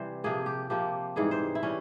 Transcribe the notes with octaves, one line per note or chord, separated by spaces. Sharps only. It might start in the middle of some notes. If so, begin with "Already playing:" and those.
Already playing: C3 E3 G3 C5
C3 F3 A#3 G#4
G4
C3 F3 A#3 G4
G#2 E3 G3 G#4
C5
E4
E3 G3 C#4